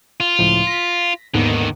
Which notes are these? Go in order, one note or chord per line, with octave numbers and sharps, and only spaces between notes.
F4
C#2 A2 F3
A#6 B6
D#2 G#2 D3 D#3 B3